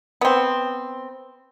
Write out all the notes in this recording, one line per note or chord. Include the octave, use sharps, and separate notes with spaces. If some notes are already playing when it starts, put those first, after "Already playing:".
B3 C4